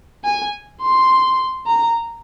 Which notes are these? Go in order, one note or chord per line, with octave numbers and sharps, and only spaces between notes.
G#5
C6
A#5